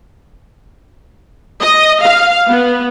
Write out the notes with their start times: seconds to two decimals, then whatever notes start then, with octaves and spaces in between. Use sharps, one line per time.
1.61 D#5
2.03 F5
2.49 B3